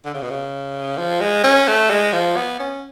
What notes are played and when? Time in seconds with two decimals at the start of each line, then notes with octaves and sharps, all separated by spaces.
0.05 D3
0.14 C#3
0.22 B2
0.30 C#3
0.98 F3
1.21 G#3
1.44 C#4
1.68 A3
1.90 G#3
2.13 F3
2.36 B3
2.60 C#4